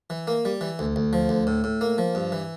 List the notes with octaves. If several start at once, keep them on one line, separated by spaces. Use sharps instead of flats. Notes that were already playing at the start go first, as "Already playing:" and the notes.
E3
A#3
G3
E3
D2
D2
F3
D2
A2
A2
A#3
F3
G2
E3